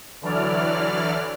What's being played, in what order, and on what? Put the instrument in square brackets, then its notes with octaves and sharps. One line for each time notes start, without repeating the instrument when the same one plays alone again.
[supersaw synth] D3 E3 F#3 D5 F6